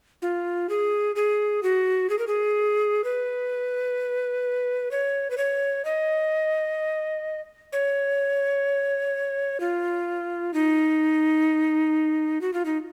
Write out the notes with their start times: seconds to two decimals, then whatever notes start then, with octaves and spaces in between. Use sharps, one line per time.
0.22 F4
0.69 G#4
1.16 G#4
1.63 F#4
2.10 G#4
2.19 A#4
2.27 G#4
3.04 B4
4.91 C#5
5.31 B4
5.38 C#5
5.85 D#5
7.73 C#5
9.60 F4
10.54 D#4
12.41 F#4
12.53 F4
12.65 D#4